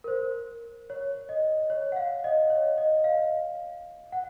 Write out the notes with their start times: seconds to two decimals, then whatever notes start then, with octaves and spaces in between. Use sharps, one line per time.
0.04 A#4
0.08 C5
0.90 C#5
1.29 D#5
1.70 C#5
1.92 F#5
1.96 F5
2.24 D#5
2.50 C#5
2.78 D#5
3.04 F5
4.12 F#5